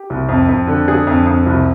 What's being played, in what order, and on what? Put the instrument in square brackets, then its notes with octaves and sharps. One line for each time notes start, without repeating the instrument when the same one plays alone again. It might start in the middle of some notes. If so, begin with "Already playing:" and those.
Already playing: [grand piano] G4
C2
F2
F2
D3
D3 G#4
F2
F2
C2